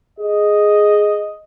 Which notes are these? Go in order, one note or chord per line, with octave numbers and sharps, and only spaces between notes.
G#4 D#5